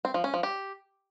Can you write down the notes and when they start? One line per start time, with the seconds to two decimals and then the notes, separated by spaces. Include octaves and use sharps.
0.05 C4
0.14 F3
0.24 C#4
0.34 F3
0.43 G4